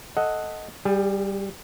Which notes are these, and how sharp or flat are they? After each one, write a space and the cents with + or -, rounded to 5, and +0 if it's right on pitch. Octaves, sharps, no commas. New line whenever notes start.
A4 +0 D#5 +10 F#5 +0
G3 +0 G#4 -40